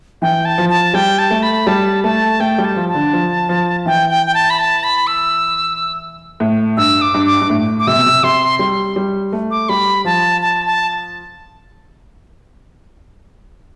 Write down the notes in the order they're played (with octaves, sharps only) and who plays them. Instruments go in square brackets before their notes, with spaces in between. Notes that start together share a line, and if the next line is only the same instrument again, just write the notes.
[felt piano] E3 [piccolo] G5
[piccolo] A5
[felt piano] F3
[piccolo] A5
[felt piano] G3 [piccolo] G5
[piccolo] A5
[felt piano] A3
[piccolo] B5
[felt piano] G3 [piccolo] A5
[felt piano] A3 [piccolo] A5
[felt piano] A3 [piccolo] G5
[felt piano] G3
[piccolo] A5
[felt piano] F3
[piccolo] A5
[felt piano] D3
F3
F3
[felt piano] E3 [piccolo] G5
[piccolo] G5
G5
A5
B5
A5
B5
E6
[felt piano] A2
[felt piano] G2 [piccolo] E6
[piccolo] D6
[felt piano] G2
[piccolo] D6
[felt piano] G2
A2
[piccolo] D6
[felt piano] C3 [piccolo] E6
[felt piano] B2
C3
[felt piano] C3 [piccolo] C6
[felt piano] G3 [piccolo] C6
[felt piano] G3
A3
[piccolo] D6
[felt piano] G3 [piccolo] B5
[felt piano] F3 [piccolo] A5
[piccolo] A5
A5